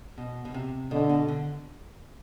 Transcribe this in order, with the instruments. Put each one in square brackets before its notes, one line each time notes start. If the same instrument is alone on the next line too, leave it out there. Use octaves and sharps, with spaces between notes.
[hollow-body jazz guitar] B2
B2
C3
[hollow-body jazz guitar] B2 [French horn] D3
[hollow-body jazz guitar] B2
D3